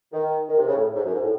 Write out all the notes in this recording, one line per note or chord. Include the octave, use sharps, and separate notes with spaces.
D#3
D#3
C3
C#3
A2
G#2
F#2
G#2
A2